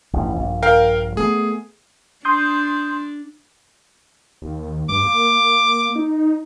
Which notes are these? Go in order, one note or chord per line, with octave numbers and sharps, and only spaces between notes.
A1 E2 G2
A#1 G2
A#4 F5 G5
A3 B3 G#4
D4 C6 D#6 G6
D#2
G2 D6
A#3
D#4